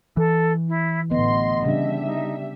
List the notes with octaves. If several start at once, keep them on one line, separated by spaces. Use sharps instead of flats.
E3 A4
E4
A1 D3 B3 D#5 C6
C#3 G3 D4 E5
D#4